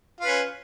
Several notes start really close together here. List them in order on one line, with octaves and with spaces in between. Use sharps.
F4 B4 C#4